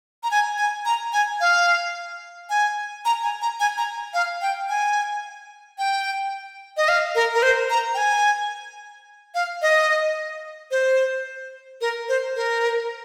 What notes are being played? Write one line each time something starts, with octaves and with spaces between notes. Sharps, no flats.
A#5
G#5
G#5
A#5
G#5
F5
G#5
A#5
G#5
A#5
G#5
A#5
F5
G5
G#5
G5
D#5
F5
A#4
A#4
C5
A#5
G5
G#5
F5
D#5
C5
A#4
C5
A#4